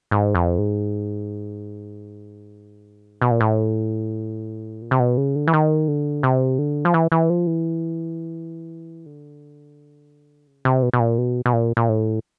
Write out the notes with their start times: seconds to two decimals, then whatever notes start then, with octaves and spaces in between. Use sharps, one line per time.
0.11 G#2
0.35 F2
0.58 G#2
3.22 B2
3.31 A#2
3.41 A2
4.82 A#2
4.91 C3
5.00 B2
5.17 C#3
5.36 D3
5.48 E3
5.53 D#3
5.88 D3
6.23 C3
6.59 D3
6.85 F3
6.94 E3
7.12 E3
7.30 F3
7.47 E3
9.06 D3
10.47 C#3
10.65 C3
10.82 B2
10.93 B2
11.00 A#2
11.18 B2
11.46 B2
11.53 A#2
11.77 A#2
11.89 A2